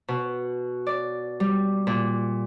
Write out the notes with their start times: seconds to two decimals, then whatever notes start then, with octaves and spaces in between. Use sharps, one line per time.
0.08 B2
0.87 D5
1.40 G3
1.87 A#2